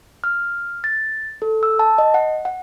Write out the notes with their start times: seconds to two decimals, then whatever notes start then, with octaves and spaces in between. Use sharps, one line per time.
0.24 F6
0.84 A6
1.42 A4
1.63 E6
1.79 A5
1.98 D#5
2.14 F#5
2.45 F#5